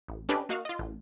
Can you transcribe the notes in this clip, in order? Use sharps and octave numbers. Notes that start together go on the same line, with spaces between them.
A1
C#4 D4 G4 A4 B4 D#5
A#3 F#4 D#5 F5
F4 D#5
A1